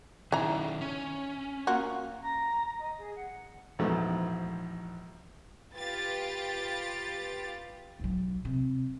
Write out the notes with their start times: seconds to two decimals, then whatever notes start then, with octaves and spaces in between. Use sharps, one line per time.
0.32 D#3 E3 C#4 A#5
0.81 C#4
1.67 A#3 F4 F#4
2.21 A#5
2.79 D#5
2.98 G#4
3.16 F#5
3.79 A#1 E2 G#2 B2 F3 A3
5.76 F4 G4 B4 A6
7.99 B1 F#3
8.45 C3